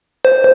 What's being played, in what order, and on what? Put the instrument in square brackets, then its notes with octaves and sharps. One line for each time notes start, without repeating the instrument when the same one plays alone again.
[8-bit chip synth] C5